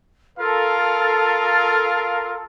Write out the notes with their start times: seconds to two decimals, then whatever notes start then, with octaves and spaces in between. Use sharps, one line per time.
0.38 F4 A4 A#4 F5